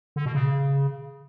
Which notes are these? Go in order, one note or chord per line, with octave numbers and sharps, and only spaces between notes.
D3
B2
C#3